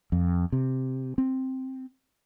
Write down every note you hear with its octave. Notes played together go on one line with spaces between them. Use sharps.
F2
C3
C4